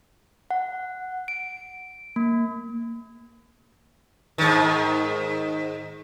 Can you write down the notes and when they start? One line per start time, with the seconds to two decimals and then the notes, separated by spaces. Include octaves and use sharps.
0.51 F#5
1.28 D7
2.16 A#3
4.38 G#2 D#3